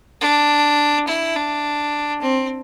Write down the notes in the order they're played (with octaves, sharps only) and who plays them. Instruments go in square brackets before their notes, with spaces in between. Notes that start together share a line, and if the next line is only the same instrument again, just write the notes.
[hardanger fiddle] D4
E4
D4
C4